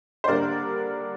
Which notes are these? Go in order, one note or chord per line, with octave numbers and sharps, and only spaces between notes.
C5
D3 G3 A#3 D4 A#4 D5